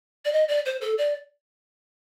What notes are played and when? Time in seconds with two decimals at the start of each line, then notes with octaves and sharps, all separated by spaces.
0.25 D5
0.33 D#5
0.48 D5
0.66 C5
0.81 A4
0.98 D5